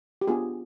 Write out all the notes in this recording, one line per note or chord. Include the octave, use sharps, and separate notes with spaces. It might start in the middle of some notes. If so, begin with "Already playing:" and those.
G4
B3 D4 F4 G#4